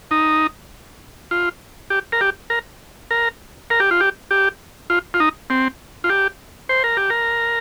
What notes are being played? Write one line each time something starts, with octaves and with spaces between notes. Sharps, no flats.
D#4
F4
G4
A#4
G4
A#4
A#4
A#4
G4
F4
G4
G4
F4
F4
D#4
C4
F4
G4
C5
A#4
G4
A#4